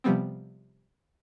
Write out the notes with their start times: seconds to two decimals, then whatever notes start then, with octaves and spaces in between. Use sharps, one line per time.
0.04 C3 F3 G3 B3 C4